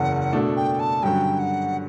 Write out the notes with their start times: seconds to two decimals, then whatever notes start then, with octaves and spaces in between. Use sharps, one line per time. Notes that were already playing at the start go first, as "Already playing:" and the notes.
Already playing: F#1 E2 C#3 F#5
0.32 B2 A3 D4 A4
0.57 G5
0.80 A5
1.03 G2 D3 F#3 C#4 G5
1.39 F#5